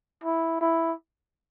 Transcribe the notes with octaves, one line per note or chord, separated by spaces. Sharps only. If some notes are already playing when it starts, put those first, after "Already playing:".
E4
E4